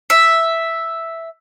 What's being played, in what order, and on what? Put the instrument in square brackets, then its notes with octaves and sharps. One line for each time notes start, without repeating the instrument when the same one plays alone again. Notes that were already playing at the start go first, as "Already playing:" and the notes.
[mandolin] E5